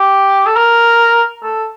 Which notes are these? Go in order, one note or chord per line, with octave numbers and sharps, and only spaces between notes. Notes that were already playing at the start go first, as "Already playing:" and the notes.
Already playing: G4
A4
A#4
A4